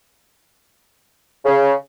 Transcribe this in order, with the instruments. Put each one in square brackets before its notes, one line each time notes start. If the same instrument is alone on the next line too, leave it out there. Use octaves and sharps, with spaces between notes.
[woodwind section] C#3